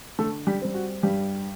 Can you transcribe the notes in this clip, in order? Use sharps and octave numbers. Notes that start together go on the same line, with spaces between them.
D3 A3 A4
G3 G4
G3 C4
F#4
G2 G3 G4